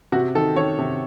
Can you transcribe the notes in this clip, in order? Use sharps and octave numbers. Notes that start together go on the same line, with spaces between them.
C3 F#4
D#3 A4
D#3 C#5
C3